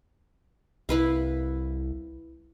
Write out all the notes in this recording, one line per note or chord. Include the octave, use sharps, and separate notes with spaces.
C2 E4 B4 F5